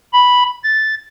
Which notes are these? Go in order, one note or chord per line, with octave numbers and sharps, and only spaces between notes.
B5
A6